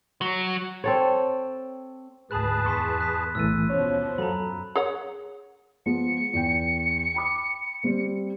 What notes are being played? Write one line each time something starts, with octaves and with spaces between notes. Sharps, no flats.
F#3
C4 A4 C#5
D2 G#2 G#4 B4 A5 B5 F#6
E2 C6 C#6 B6
F#6 B6
B1 A2 E3 A3 E6 A6 D#7
D#2 B2 F3 C#4 C#5
F#2 F#3 A4 A#5 B5
G#4 C#5 F#5
F3 G#3 B3 C#7
E2 G5
G5 B5 D6
G3 C4